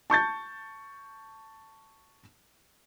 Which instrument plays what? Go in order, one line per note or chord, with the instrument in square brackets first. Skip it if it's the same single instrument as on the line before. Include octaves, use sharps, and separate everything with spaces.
[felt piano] A5 C#6 G6 A6